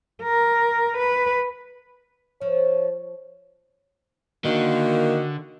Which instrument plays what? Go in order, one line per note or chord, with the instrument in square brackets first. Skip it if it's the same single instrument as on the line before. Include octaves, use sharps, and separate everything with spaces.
[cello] A#4
B4
[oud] F3 [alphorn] C#5
[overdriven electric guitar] D3 [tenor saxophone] D#3 [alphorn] A#3 [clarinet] F#4